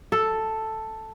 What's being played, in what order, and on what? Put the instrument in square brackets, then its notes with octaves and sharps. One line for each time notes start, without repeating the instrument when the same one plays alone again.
[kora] A4